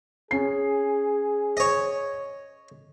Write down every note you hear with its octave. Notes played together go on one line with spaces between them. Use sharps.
C#4 G#4 C7
C#5 D#5